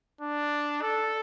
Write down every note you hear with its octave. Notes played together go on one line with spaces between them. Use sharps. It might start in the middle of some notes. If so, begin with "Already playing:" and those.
D4
A4